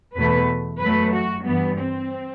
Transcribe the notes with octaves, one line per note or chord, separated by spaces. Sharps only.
E2 B2 A3 B4
F#2 F#3 A3 B4
F#4
G2 E3 G3 B3
C4